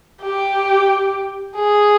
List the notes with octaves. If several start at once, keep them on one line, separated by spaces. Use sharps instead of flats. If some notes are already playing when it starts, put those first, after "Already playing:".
G4
G#4